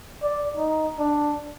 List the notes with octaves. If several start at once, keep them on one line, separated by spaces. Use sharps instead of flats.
D5
D#4
D4